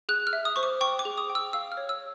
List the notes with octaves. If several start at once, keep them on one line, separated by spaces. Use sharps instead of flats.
G#4 F#6
F6
E5
D#6
C5 C#6
D6
G5 C#6
D6
G#4
D#6
G5
E6
F5 E6
F6
C#5
E6